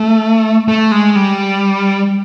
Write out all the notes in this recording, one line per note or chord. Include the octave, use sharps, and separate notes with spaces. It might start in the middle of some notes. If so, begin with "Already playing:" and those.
Already playing: A3
A3
G#3
G3